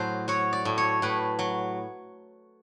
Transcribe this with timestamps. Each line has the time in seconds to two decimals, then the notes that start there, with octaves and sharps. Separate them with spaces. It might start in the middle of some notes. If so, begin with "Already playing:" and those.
Already playing: A2 F#3 C5
0.28 F#3 C#5
0.53 D5
0.65 A2
0.78 C#5
1.02 A2 B4
1.39 F#3